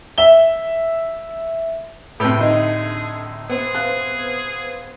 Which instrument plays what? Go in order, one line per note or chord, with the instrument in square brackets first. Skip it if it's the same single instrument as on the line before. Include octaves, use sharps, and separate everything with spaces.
[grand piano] E5 G7
[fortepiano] A2 C3 [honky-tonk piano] B4 [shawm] G5
[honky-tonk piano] D3 [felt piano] D#4 [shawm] G#4
[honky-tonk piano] B3 C4 [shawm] G#4
[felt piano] F5 F#6